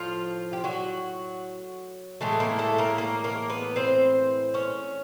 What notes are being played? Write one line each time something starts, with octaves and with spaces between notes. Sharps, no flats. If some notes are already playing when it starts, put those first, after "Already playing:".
Already playing: A2 F3 F4
G4
F#3 F#4
A2 E3 G#3 A3 A4
A#3 A#4
A3 A4
A#3 A#4
A#3 A#4
A#3 A#4
B3 B4
C4 C5
C#4 C#5